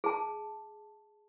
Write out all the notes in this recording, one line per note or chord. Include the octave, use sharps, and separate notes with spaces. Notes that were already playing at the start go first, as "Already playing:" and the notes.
G#4 A5